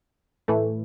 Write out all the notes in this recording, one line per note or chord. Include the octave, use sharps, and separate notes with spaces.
A2 E3 A3